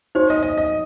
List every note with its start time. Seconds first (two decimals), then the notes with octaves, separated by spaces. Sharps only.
0.15 D#4 F#4 C5 C#5
0.30 D#5
0.43 D#5
0.58 D#5